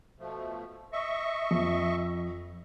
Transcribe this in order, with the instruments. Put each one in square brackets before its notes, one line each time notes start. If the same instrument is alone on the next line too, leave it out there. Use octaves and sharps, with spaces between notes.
[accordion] B2 F3 A3
D#5 E5 C#6
[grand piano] F2